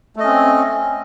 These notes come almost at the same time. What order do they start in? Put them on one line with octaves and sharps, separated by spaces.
A3 D#5 C#4 C4